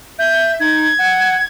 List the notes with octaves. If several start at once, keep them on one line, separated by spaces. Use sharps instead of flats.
E5 G6
D#4 G#6
F#5